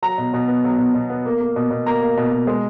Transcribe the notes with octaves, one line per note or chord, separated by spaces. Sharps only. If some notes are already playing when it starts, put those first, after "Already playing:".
F#3 A#5
B2
B2
B3
F#3
B2
B2
B3
A#3
A#3
B2
B2
A#3 A#5
A#3
B2
B2
G#3